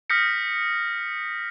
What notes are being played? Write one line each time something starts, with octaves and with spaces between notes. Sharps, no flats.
D#6 F6 G6 A#6 B6 C#7